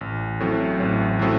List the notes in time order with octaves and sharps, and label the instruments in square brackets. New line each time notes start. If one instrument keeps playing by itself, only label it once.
[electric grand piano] A1
A2 F#3 A3 C4
A1
A2 F#3 A3 C4